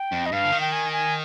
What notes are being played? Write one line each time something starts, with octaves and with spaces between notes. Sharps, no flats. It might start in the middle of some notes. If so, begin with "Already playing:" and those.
Already playing: G5
F2
D#5
G2 F5
D3
D#3
G5
G#5
G#5